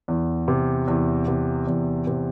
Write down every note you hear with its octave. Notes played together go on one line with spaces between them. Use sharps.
E2
C3
E2
C3
E2
C3